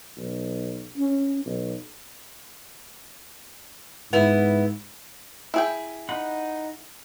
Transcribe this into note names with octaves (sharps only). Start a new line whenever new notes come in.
B1
C#4
B1
G#2 B3 E4
E4 G#4 G5
D#4 F#5 B5